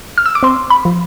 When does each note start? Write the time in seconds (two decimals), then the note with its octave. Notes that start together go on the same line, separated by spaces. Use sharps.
0.18 F6
0.26 E6
0.35 D6
0.43 C4 C6
0.70 B5
0.85 F3